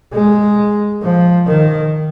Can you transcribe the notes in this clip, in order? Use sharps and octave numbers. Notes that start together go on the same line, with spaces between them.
G#3
F3
D#3